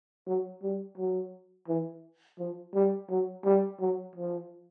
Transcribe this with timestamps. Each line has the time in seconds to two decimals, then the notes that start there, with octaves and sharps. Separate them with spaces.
0.27 F#3
0.63 G3
0.98 F#3
1.68 E3
2.39 F3
2.75 G3
3.10 F#3
3.45 G3
3.80 F#3
4.16 F3